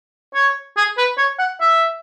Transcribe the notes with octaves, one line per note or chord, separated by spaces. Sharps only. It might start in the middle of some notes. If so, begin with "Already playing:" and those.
C#5
G#4
B4
C#5
F#5
E5